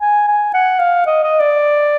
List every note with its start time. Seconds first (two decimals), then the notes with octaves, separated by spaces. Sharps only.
0.01 G#5
0.28 G#5
0.54 F#5
0.79 F5
1.06 D#5
1.23 D#5
1.40 D5